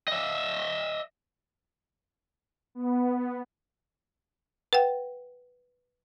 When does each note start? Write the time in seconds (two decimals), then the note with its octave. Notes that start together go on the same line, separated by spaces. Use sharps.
0.08 D#5 E5
2.75 B3
4.73 B4 F#5 G5